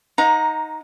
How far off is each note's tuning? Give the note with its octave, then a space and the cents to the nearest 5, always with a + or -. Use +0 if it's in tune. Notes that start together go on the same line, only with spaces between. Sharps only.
D#4 +10 F#5 -45 A#5 +0